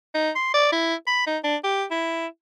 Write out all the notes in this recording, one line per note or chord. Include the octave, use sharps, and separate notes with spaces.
D#4
C6
D5
E4
B5
D#4
D4
G4
E4